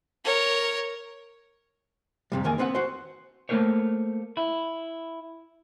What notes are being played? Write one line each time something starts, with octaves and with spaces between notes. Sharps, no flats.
A#4 C#5
F2 C3 G3
E2 D#3 A#3 G#5
B3 C4 B4 F#5
F#4 C5
A3 A#3 C#4 A#4 C5 C#5
E4